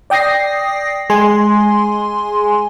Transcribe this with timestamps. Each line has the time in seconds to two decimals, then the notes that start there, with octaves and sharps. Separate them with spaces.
0.10 D5 G5 D#6 A#6 C7
1.10 G#3 G#4 G#5 C6